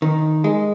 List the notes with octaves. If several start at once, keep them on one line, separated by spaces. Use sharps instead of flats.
D#3
G#3